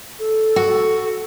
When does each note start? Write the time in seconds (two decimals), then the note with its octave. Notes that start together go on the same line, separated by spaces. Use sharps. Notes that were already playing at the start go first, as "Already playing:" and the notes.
0.19 A4
0.56 F#4